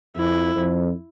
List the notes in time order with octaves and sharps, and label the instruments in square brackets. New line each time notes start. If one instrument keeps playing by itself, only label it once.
[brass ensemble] F2 [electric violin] E4
[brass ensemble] F2